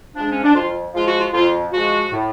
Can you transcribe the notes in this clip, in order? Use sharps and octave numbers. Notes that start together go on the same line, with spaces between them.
F3 G#3 D4
C#4
D4
F2 F4
F3 G#3 F4
F#4
F4
F2 F4
F3 G#3 F#4
A2